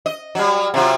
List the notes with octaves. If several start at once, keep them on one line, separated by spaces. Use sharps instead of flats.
D#5
F#3 G3
C3 F#3 F4